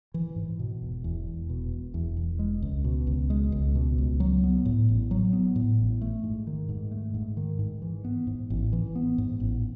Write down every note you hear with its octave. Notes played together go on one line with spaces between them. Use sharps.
E3
G#2
B2
E1
E2
E1
B2
E1
E2
E1
G#3
C#2
B2
C#2
G#3
C#2
B2
C#2
F#3
B3
A2
A1
F#3
B3
A2
A1
A3
G#2
D#3
G#2
A3
G#2
D#3
G#2
E3
B3
G#2
A1
E3
B3
G#2
A1